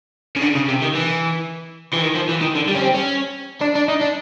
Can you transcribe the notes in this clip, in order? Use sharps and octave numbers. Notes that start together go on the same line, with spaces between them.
C#3
D3
C#3
C3
D#3
E3
E3
D#3
F3
E3
D#3
D3
G3
C#4
C4
C#4
D4
D4
D#4
D4